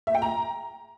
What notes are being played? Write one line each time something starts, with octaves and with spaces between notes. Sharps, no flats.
E5
G5
A#5